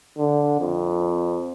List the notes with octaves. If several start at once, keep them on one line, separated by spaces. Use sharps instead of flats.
D3
F2